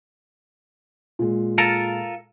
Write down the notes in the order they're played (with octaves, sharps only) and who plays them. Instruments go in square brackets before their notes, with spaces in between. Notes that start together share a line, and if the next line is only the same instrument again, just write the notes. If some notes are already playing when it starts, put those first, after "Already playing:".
[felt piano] A#2 G#3
[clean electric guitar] F4 A4 A#4